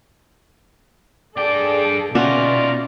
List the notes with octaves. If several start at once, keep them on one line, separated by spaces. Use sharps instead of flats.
G2 G#4 A4 D5 G5
B2 C#4 D#4 F4 F#4 D5 E5